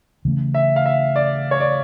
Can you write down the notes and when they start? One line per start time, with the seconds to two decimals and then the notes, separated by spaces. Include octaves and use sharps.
0.25 C#3 E3 A3 C#4
0.54 E5
0.76 F5
0.86 E5
1.16 D5
1.51 C#5
1.60 D5